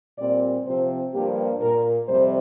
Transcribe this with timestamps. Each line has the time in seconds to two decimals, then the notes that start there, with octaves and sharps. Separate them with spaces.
0.18 A#2 G3 C4 D5
0.66 C3 F3 C4 C5
1.14 G2 F3 A#3 G4
1.61 A#2 A#3 A#4
2.09 F2 C3 G3 C5